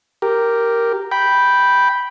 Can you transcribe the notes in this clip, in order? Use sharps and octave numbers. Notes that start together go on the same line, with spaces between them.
G4 A#4
G5 B5